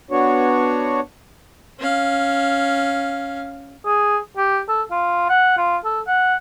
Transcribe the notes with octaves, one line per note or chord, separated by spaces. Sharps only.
B3 D4 F#4 C#5
C#4 F5
G#4
G4
A4
F4
F#5
F4
A4
F#5